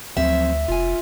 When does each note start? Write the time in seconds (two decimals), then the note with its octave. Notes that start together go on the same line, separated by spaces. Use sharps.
0.17 D2 F3 F#3 C4 E5
0.68 F1 F4 G#5